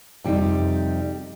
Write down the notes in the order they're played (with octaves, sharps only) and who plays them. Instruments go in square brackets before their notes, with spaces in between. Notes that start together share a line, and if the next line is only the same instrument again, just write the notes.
[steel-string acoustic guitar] F2 C3 G3 D#4 G4